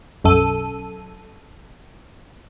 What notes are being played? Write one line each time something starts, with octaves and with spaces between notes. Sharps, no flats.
B1 F#2 A4 D#7